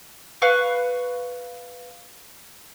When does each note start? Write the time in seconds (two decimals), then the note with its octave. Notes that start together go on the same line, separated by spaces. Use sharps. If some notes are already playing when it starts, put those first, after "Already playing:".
0.42 B4 F5 C#6 F#6